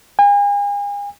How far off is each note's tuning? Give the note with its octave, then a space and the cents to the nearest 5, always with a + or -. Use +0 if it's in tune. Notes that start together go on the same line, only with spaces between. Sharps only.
G#5 -40